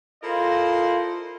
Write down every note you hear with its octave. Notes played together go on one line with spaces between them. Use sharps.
E4 F4 A4 A#4 C5 D#5